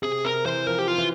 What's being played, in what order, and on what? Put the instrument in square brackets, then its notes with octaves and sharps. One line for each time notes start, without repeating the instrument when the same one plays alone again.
[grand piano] C3 [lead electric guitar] G#4
[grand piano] C3 [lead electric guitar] A#4
[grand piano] E3 [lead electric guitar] C5
[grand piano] F3 [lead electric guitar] A#4
[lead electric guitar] G4
F4
[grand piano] E3